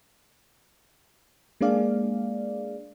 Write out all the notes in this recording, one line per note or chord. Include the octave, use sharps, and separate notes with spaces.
G#3 A#3 D4 G#4 D5 F5